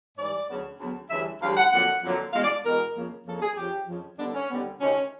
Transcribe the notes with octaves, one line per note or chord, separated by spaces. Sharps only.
G#2 E3 G3 D5
D2 C#3 F#3 B3
D2 C#3 F#3 B3
D2 C#3 E3 G3 E5
D2 C#3 E3 G3 F5
F#5
F2 D3 F#3 A#3 F#5
F2 D3 F#3 A#3
E2 B2 G#3 F5
D5
E2 B2 G#3 A#4
F2 C#3 F3 A#3
F2 C#3 F3 A#3 A4
G#4
F2 C#3 F3 G4
F2 C#3 F3
D#2 D3 G3 B3 D4
C#4
D#2 D3 G3 B3
D2 C3 D#3 C#4